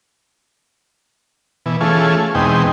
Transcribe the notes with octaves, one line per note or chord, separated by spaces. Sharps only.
B2 E3
E3 A3 C#4 F4 G#4
E2 B2 G#3 C4 D#4 G5